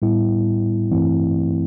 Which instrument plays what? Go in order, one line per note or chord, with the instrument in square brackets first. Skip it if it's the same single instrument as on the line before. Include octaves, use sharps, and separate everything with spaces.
[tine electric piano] A2 G3 B3 E4
G2 E3 A3 C4 E4